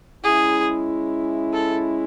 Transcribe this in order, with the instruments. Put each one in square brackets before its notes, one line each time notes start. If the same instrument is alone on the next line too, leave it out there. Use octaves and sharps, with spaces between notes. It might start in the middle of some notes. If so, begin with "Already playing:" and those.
[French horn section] G#3 C#4 E4 [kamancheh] G#4
[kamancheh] A4